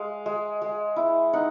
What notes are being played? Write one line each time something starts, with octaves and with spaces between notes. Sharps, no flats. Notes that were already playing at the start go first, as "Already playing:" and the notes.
Already playing: G#3 F5
G#3
G#3
E4
D#4 F#5